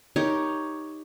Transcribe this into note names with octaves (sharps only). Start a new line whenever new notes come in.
D#4 G4 A#4 C#5